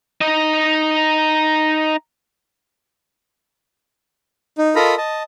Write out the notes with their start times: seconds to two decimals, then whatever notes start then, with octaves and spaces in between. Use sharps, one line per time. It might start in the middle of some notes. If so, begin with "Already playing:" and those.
0.21 D#4 D#5
4.58 D#4
4.75 F4 A4 A#4 D#5 A#5 B5
4.98 D#5 A5